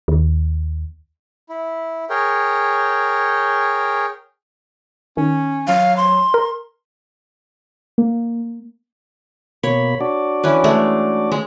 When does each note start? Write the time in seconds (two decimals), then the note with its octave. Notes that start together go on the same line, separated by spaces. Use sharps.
0.08 D#2
1.49 E4
2.10 G#4 A#4 C#5 G5
5.17 D#3 C#4
5.68 F#3 F5
5.97 C6
6.34 A#4
7.98 A#3
9.63 B2 A#3 C#5 B5
10.01 D4 F#4 D5
10.43 E3 C#4 B4
10.64 G#3 A3 G#4
11.32 G#3